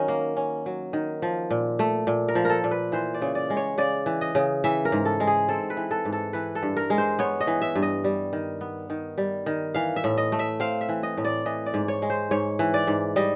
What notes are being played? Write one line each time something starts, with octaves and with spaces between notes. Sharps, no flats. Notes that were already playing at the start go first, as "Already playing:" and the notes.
Already playing: D#3 F#3 C#4
A#3
C#4
F#3
D#3
F3
A#2
A3
A#2
A#4
F3
A4 A#4
A#2
B4
E3 C5
D5
C#3
D5
G#3
C#5
C#3 D5
E3
D#5
C#3
E3 E5
A#4
G#2
A4
G#3
G#4
C4 A4
B4
E3
A4
G#2
A4
E3 B4
A4
G2
A#4
G#3
C5
B3 C#5
D#5
E3
E5
G2
D#5
G3
D#3
B3
D#3
G3
D#3
E3 F5
E5
A2
D#5
A3
E5
C4 F5
E5
E3
D#5
A2
D5
E3 D#5
D5
G#2
C#5
G#3
C5
G#2 C#5
E3
D5
G#2
G3 D#5